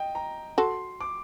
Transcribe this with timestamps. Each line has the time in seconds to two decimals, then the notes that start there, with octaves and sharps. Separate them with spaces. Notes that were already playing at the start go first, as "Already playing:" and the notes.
Already playing: D#5 G5
0.15 A#5
0.58 F#4 A4 C6
1.01 D6